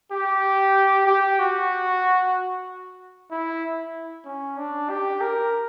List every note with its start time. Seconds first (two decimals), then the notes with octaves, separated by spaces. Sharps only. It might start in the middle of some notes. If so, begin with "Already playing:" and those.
0.11 G4
1.07 G4
1.39 F#4
3.31 E4
4.25 C#4
4.57 D4
4.90 G4
5.21 A#4